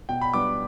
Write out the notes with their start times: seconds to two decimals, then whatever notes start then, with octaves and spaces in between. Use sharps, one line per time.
0.09 B2 G5
0.21 B5
0.34 G3 B3 D4 D6